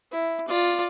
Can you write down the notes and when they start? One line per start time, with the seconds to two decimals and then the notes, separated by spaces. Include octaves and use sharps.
0.11 E4
0.48 F4 D5